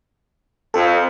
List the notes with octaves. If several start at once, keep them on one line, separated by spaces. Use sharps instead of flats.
F2 A4